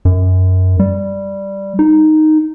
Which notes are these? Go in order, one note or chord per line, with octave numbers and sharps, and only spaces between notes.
F#2
G3
D#4